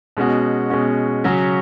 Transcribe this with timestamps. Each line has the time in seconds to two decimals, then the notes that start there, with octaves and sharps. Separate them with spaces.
0.17 B2 G#3 C#4 F#4
0.70 B2 G#3 C#4 F#4
1.24 C#3 F#3 C#4 F#4